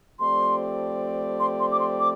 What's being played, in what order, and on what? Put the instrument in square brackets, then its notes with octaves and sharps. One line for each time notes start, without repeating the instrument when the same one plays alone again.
[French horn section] F3 A3 C4 G4 D5 [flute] C6
[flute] C6
C6
D6
C6
D6